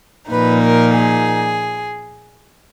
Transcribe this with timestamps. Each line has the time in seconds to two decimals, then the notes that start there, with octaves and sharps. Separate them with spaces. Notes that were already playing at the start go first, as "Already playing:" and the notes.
0.30 A#2 F3 A#3 D#4 B4
0.63 A#4
0.94 G#4